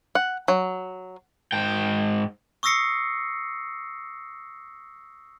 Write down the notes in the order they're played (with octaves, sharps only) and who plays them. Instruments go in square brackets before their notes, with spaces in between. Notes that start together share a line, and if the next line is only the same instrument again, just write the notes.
[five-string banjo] F#5
F#3
[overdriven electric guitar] G#2 G5
[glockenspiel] C#6 D#6 E6 A#6 C7 C#7